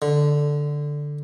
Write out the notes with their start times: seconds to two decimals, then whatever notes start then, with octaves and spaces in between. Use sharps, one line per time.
0.02 D3